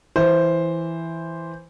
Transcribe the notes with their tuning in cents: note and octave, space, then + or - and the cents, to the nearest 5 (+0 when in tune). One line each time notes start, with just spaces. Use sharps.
E3 +0 C5 +0